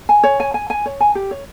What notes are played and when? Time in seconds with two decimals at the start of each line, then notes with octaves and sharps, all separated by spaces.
0.09 G#5
0.24 C#5
0.40 G#5
0.54 G#5
0.70 G#5
0.86 C#5
1.00 G#5
1.15 G4
1.31 C#5